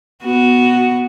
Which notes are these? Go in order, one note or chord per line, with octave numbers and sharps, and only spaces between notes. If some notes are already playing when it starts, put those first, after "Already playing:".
B3 F#4